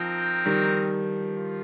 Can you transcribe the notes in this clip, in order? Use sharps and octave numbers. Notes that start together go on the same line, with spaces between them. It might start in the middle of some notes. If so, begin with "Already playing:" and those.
Already playing: F3 C4 D#4 A#4 G5
D#3 G3
F4